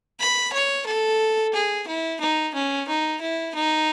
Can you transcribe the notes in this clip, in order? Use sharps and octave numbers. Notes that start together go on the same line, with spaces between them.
B5
C#5
A4
G#4
E4
D#4
C#4
D#4
E4
D#4